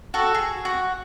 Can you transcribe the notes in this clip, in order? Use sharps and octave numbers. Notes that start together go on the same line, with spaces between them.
F#4 A4
G#4
F#4